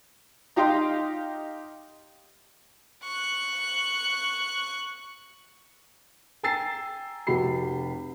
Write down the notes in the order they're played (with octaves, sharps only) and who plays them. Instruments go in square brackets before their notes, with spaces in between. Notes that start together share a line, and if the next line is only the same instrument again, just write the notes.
[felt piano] D#4 G4 D#5 F5 G5 C6
[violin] C#6 F#6
[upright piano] G5 G#5 A#5 E6 A6 C7
F1 F#4 G4 B5 C7